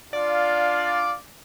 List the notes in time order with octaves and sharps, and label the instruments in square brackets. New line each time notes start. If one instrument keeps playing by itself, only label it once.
[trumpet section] D4 F4 F5 [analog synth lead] D5